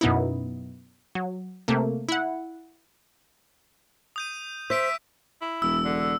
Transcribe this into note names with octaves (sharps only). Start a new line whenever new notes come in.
F#2 B2 B3 D#4 E4
F#3
C3 A3 A#3
E4 F#5
D#6 G6 D#7
C5 E5 G6 B6 D7
E4
E1 E6
D3